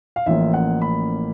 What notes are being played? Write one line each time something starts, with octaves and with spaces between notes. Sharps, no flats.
F5
A1 A2 F3 A#3 C#4 E5
F#5
B5